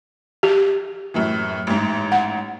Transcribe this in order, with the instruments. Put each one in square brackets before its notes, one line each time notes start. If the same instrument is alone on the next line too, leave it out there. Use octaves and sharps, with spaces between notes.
[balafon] G4
[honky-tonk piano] F#2 A2 E3
A1 G#2
[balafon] F#5